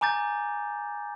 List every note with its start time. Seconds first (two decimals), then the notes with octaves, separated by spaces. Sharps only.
0.01 G#5 A#5 D6 G6 A6